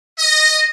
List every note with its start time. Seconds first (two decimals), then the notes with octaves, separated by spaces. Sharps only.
0.18 D#5